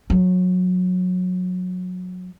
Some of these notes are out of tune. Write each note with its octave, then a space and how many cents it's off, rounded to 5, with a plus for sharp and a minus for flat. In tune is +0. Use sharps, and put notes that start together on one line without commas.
F#3 -25